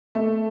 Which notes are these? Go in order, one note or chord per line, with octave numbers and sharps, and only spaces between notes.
A3